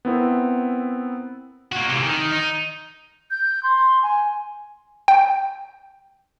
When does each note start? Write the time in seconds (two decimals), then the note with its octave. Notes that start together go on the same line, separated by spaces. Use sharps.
0.05 B3 C4 E4 A#4
1.72 A#3 F#4
1.89 C3 E3
2.03 D#3
2.32 D#4
3.31 G6
3.63 C6
4.03 G#5
5.08 G5